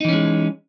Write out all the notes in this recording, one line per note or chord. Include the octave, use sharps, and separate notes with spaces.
E3 G#3 C#4 D#4